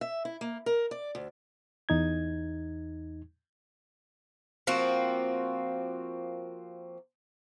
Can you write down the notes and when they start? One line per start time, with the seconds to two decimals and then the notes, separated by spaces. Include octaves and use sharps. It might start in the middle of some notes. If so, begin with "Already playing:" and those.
0.01 E5
0.25 E4
0.41 A#3
0.66 A#4
0.91 D5
1.15 D2
1.89 E2 D#4 G#6
4.67 F3 A#3 C4 F#4